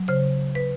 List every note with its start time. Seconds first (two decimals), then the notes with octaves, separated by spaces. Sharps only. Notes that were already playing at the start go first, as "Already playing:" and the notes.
Already playing: F#3
0.08 C#3 C5
0.55 B4